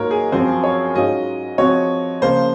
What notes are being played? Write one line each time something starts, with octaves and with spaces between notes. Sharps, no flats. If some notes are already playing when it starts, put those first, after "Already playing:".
Already playing: G#2 F#3 A#3 F4 A#4 C#5
G#4
F#2 F3 C4 C5
C#5
G#2 F#3 C#4 F4 G#4 D#5
F3 C4 F#4 C#5
C#3 F3 A#3 F4 C5